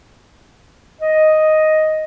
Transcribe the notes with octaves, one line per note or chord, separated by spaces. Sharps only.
D#5